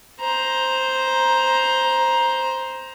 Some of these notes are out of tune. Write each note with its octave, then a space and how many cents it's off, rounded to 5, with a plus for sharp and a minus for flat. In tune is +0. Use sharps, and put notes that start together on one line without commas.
C5 +0 A#5 +15